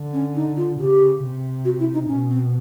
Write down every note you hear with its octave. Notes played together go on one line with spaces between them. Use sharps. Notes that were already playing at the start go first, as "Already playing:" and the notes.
Already playing: D3
C#4
D#4
F4
C#3 G4
C3
F#4
E4
D#4
B2 C#4
C4